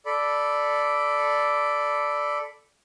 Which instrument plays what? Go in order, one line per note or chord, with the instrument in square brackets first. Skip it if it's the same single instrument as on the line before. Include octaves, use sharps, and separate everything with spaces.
[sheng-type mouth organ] A4 D5 B5